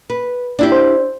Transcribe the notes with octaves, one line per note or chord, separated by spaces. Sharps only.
B4
D4 E4 G4
C5